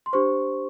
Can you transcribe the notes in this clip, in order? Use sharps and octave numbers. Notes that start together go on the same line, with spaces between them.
C6
D4 G4 C5 C#6